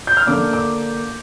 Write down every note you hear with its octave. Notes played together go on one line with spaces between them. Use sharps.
G6
F6
D3 A#3 D4 D6
D6